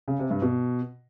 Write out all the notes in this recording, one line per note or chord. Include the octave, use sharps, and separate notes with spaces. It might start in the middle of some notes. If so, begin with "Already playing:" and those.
C#3
C3
G2
B2